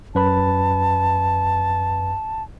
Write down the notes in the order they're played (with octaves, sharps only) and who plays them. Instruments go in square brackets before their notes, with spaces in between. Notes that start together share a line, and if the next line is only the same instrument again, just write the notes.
[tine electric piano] F#2 B4 B5 [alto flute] A5